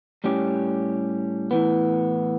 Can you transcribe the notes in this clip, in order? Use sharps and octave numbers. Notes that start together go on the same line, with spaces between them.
A2 G3 C#4 G4
A2 E3 B3